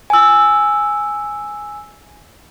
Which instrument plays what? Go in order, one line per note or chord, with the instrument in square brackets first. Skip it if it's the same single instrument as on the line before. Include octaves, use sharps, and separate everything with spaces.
[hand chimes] G#5 E6